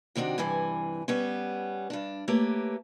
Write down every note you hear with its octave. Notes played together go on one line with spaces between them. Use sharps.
C3 D#3 C4 D4 F#4
G2 C3 E3 G#5
G3 B3 C#4
G2 D4
A3 A#3 G4 B4 C#5